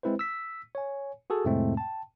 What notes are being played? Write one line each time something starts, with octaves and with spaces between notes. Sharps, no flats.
G#3 C4 E4 B4 C5
E6 B6
C#5 G#5
F#4 G#4 A4
F2 A2 C3 G#3 A3 C4
G5 A5